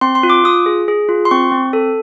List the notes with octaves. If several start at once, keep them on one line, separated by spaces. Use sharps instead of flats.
C4 C6
C6
F4
D6
F4 D#6
G#4
G#4
F4
C6
C4 C#6
C4
A4